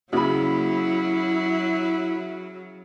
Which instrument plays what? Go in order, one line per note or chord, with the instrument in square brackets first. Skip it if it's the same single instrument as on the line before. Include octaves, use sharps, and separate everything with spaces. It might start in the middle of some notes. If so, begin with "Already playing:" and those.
[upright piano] C#3 B5 [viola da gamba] F#3 [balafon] A#3 F#4 [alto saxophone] E4